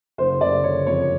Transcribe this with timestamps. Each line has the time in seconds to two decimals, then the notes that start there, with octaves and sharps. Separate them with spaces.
0.18 F#1 C5
0.41 F#1 D5
0.63 D3 C#5
0.86 F2 C#5